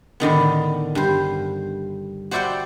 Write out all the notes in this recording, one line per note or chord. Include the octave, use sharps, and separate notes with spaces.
A2 D3 D#3 B3
G2 C5
F#4 C5 D5 E5 F#5 G5